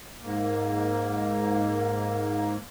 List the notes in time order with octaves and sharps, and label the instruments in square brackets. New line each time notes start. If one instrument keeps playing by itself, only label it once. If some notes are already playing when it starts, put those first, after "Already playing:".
[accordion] G#2 A#3